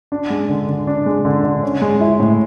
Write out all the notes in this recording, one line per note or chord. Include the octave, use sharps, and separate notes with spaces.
D4
G#3
D3
D3
D4
G#3
D3
D3
C#4
G#3
E4
A2